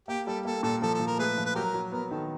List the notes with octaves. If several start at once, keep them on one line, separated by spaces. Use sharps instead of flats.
A#3 G4
G3 A4
A#3 A4
A#2 A4
F3 A4
A4
F3
A#4
A3 G#4 B4
F3
B4
F#3 G4 A#4
F#3
B3 A#4
D#3 A4